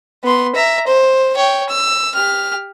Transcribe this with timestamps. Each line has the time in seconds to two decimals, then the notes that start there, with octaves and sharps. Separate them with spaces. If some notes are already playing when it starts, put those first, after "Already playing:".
0.24 B3 C6
0.55 E5 A#5
0.87 C5
1.37 C#5 G5
1.69 E6
2.14 G4 F6